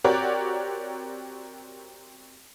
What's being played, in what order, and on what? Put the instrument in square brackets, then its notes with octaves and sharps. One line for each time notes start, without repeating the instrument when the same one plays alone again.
[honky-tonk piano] C4 F#4 G4 A#4 C#5 D5